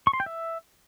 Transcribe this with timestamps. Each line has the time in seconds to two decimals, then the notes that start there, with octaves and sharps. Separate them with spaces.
0.07 C#6
0.13 C6
0.20 G5
0.26 E5